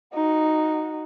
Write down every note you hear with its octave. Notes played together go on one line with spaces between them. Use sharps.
D#4 F#4